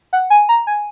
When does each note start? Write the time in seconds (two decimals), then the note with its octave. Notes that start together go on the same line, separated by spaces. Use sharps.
0.13 F#5
0.30 G#5
0.49 A#5
0.67 G#5